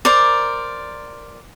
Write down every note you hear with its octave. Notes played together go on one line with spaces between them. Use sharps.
A#4 C5 D5